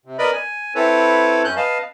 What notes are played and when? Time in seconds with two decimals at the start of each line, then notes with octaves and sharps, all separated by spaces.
0.05 C3
0.19 A#4 B4 D5 D#5 B5
0.33 G#5
0.75 C4 E4 A4 B4 C#5
1.45 F#2 C#4 F#6 G6
1.57 B4 D#5 F5 A5